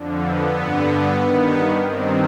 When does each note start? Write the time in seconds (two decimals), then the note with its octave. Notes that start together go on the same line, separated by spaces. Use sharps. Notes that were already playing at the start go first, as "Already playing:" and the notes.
Already playing: F2 D3
0.24 B3
0.57 G2 D3
1.21 G2 D#3
1.86 G2 D#3 C4